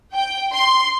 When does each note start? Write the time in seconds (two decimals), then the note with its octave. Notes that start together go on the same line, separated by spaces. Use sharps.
0.13 G5
0.53 C6